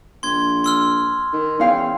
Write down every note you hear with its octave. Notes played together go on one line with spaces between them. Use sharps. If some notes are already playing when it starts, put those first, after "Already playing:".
A#1 C6 G#6
C6 E6 F6
D#3
E2 C#4 F5 G5